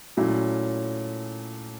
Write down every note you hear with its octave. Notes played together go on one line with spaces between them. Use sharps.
A#2 F#3 A3 C#4 E4